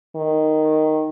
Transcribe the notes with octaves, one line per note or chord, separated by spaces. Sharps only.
D#3